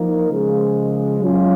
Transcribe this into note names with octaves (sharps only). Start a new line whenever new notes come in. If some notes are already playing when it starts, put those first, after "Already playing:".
Already playing: F3 A#3 D#4 A#4
C#3 F3 G#3
F#3 C#4 F4